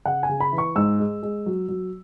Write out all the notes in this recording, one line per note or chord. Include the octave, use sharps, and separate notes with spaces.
C#3 F#5
G#5
C#3
B5
E3
C#6
G#2 E6
G#3
G#3
F#3
F#3